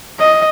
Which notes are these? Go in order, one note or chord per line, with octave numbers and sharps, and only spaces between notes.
D#5